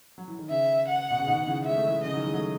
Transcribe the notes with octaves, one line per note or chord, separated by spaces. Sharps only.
F#3
E3
D#3
C#3 E5
F#5
B2
C#3
B2 D#3
C#3 E3
G#3 E5
A3
E3 G#3
C#3 E3 D#5
D#3 F#3
E3 G#3
F#3 A3